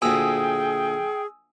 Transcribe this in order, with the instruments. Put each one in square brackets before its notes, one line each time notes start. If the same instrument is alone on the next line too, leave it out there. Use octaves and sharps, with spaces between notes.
[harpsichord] D2 A#2 [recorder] G#4 [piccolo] G5 [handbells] G#5 D#6 E6